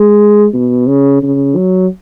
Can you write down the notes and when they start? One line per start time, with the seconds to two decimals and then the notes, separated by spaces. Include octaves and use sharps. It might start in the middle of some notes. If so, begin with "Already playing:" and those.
Already playing: G#3
0.53 B2
0.87 C#3
1.22 C#3
1.56 F#3